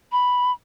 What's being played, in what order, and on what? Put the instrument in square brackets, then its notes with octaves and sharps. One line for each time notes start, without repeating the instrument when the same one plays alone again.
[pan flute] B5